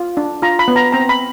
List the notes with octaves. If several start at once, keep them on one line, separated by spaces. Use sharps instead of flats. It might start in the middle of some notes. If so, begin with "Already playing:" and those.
Already playing: F4
D4
F4 A#5
B5
B3
A#5
C4 A#5
B5